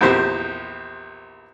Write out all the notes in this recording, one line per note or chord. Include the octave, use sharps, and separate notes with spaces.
A#1 E2 C4 G4 C5